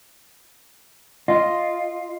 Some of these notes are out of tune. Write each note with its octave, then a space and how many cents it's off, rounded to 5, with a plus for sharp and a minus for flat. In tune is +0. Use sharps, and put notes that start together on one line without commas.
F4 +0 D#5 +0